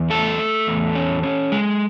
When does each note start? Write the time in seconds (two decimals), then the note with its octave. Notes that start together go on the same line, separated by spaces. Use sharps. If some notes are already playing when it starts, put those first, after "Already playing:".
Already playing: E2
0.10 A3 A4
0.39 A3
0.67 E2
0.95 C#4
1.23 C#4
1.52 G#3